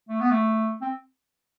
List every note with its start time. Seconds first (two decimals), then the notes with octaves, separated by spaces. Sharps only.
0.09 A3
0.21 B3
0.31 A3
0.81 C4